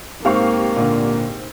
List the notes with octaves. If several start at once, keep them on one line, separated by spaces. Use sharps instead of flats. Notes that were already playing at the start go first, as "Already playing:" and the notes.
G#2 A#3 C4 G4 F5 C#6
A#2 D3